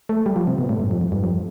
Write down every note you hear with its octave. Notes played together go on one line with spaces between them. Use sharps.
A3
G3
F3
C3
B2
A2
G2
F2
F2
G2
F2